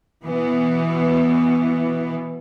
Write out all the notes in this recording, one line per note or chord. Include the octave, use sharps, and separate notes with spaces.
B2 E3 B3